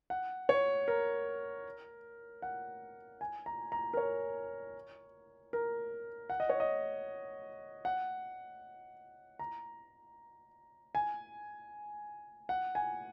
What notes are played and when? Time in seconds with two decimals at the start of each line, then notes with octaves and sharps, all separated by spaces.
0.10 F#5
0.49 C#5
0.88 A#4
2.42 F#5
3.21 G#5
3.46 A#5
3.72 A#5
3.94 A#4
3.97 C#5
5.53 A#4
6.30 F#5
6.40 D#5
6.49 C#5
6.60 D#5
7.85 F#5
9.39 A#5
10.95 G#5
12.49 F#5
12.75 G#5